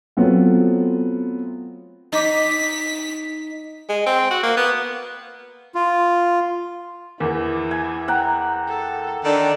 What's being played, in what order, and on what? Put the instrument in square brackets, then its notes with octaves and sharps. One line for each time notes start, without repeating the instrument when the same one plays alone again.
[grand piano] F#3 A3 B3 C4 F4
[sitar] D#4 [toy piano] D#5 D6 [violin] B6
[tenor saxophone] G#3
C4
F#4
A#3
B3
[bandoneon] F4
[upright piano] E2 A#3 [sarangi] E3
[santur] G#5
F#5 G5 A#5
[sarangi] A4
[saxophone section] D#3 D4 [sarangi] A4